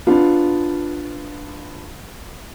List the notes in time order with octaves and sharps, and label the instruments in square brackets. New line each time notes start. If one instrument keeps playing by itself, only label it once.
[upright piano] B3 D4 F4